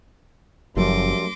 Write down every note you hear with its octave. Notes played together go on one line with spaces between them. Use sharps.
F#1 F#2 F3 G3 A3 C6 D6 A#6